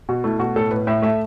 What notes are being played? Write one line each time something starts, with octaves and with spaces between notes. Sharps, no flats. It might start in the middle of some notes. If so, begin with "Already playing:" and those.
B2 F#4
A3 E4
B2 F#4
A2 A4
A2 B4
A2 E5
A3 E5